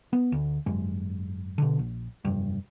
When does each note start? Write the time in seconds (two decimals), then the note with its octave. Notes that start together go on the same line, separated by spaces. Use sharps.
0.13 B3
0.32 D2
0.66 G#1 F#2 G#3
1.58 B2 D3
1.79 A#1
2.25 F1 G2